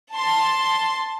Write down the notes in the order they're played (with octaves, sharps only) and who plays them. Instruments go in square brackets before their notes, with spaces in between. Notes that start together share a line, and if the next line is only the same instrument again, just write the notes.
[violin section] A5 C6